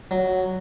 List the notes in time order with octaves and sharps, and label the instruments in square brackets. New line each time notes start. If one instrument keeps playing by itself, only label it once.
[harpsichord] F#3